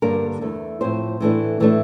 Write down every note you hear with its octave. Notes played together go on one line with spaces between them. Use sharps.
G2 D3 G3 A#3 D4 A#4
E2 E3 A3
A2 F3 C4 C5
A2 E3 A3 D4
A2 E3 A3 D4